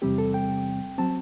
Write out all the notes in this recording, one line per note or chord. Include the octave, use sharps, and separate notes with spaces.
E2 C3 G3 C4 G4
A4
G5
F#3 C4 A5